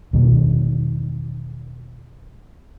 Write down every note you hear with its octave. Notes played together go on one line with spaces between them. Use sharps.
E2 B2 D#3 A#3